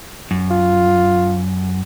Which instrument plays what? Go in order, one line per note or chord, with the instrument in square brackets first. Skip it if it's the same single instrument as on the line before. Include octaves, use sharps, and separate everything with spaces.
[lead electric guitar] F#2
[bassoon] F4